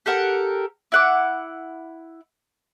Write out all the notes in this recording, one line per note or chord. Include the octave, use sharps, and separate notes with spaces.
G4 A4 A#4 F#5
E4 F#5 D6